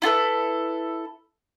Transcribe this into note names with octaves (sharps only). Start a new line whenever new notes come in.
E4 F4 A4 B4